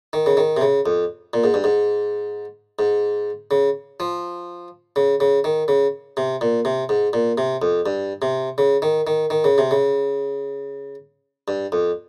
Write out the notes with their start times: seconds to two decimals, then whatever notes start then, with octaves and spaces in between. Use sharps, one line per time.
0.13 D#3
0.26 C#3
0.37 D#3
0.57 C3
0.61 C#3
0.86 F2
1.34 A#2
1.44 G#2
1.54 G2
1.64 G#2
2.79 G#2
3.51 C#3
4.00 F3
4.96 C#3
5.20 C#3
5.44 D#3
5.68 C#3
6.17 C3
6.41 A#2
6.65 C3
6.89 G#2
7.13 A#2
7.38 C3
7.62 F2
7.86 G2
8.22 C3
8.58 C#3
8.82 D#3
9.07 D#3
9.30 D#3
9.44 C#3
9.58 C3
9.71 C#3
11.48 G2
11.72 F2